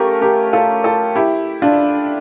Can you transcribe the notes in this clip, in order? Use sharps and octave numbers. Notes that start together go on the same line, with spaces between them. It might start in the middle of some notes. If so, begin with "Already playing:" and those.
Already playing: A3 C#4 F4 G4 A4 A#4
G4 A#4
F4 A4
F4 A4
E4 G4
D4 F4